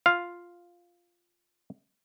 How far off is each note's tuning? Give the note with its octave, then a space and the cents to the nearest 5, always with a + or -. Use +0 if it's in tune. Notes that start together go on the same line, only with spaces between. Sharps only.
F4 +0 F5 +0